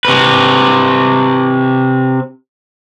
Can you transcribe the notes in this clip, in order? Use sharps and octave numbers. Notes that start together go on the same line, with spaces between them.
C3 B4